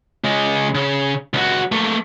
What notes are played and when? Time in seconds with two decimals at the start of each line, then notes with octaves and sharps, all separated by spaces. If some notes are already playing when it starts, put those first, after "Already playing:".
0.24 C#3 G#3
0.75 C#3
1.34 C#2 F#4
1.72 A3 A#3